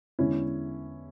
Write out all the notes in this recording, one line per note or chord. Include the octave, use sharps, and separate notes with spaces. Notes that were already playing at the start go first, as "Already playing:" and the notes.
E2 D3 G#3 C#4 E4